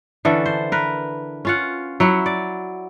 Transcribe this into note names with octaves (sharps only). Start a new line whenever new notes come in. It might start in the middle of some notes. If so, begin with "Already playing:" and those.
D3 E3 C#4 A4
C5
A#4 B4
C#4 F4 F#5
F#3 E4 F#5
D5